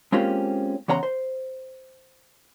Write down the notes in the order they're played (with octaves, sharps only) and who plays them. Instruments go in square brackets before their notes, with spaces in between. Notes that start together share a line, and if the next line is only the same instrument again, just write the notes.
[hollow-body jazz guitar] G#3 A#3 C4 C#4 F4 G4
E2 C#3 C#5 F#5 A#5 C6
C5